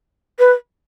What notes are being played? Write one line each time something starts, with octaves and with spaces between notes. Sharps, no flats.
B4